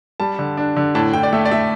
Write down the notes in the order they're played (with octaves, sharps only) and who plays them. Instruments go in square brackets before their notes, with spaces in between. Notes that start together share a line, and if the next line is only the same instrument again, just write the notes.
[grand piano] G3 A5
D3
D4
D3
A2 A5
A2 G5
D5
A3 E5
D5
A3 E5